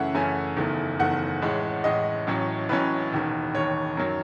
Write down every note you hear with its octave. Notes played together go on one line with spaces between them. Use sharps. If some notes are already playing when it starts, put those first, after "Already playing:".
Already playing: F#2 C#3 E3 A3 C#4 E5 F#5
F#2 C#3 E3 A3 C#4 G#5
F#1 E2 D#3 A3
F#1 E2 D#3 A3 F#5
A1 A2 G#3
A1 A2 G#3 D#5
A1 A2 F#3 C#4
A1 A2 F#3 C#4 B4
E1 D#2 D#3
E1 D#2 D#3 C#5
F#2 D#3 F#3